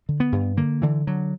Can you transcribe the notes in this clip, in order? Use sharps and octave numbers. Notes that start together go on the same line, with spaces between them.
D3
B3
G2
D3 A#3
D3 E3
D3 F#3